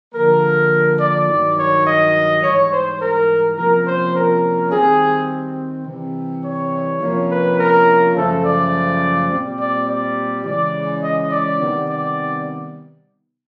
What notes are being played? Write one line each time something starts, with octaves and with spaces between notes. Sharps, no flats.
D3 F3 A#3 A#4
D5
G2 D#3 F#3
C#5
D#5
G#2 E3 G3 C#5
C5
A#4
C3 F3 A#3 C#4 A#4
C5
A#4
D#3 G3 C4 G#4
C3 E3 G3
C#5
C3 F3 A#3 C#4
B4
A#4
F#2 C#3 F3 A3 A4
D5
A#2 G3 C4
D5
D5
C#3 E3 G#3 C#4 D5
D#5
D5
C3 D#3 G3 B3
D5